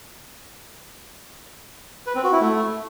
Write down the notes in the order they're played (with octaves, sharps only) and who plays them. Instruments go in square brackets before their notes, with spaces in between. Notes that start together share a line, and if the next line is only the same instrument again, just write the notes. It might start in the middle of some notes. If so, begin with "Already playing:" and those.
[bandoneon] B4
C4
F#4
E4
A3